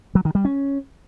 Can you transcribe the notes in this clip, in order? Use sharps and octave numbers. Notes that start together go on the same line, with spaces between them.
F#3
D#3
G3
C#4